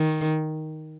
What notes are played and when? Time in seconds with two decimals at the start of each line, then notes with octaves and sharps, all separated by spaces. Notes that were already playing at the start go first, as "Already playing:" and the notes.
Already playing: D#3